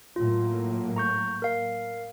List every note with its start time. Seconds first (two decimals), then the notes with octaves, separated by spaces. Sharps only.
0.16 A2 F#3 A#3 F4
0.96 A#5 C#6 G6
1.42 A#4 F5